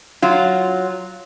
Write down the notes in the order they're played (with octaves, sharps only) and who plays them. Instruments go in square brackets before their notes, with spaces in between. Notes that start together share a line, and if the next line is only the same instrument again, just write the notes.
[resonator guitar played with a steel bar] F#3 F4